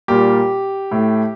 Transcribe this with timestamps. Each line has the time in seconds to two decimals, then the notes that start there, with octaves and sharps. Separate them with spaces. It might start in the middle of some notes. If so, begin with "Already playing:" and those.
0.08 A#2 G3 A#3 G4
0.91 A2 A3